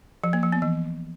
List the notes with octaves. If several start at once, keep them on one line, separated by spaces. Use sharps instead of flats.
F3
A#3
F3
B3
E3